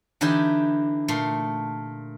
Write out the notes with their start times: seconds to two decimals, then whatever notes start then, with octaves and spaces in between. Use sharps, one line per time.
0.21 D3 E3 D#4 E4 G4
1.08 A#2 A3 C6